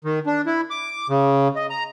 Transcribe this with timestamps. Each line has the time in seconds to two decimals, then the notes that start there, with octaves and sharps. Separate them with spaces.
0.04 D#3
0.26 D4
0.46 E4
0.71 D6
1.09 C#3
1.56 D#5
1.70 A#5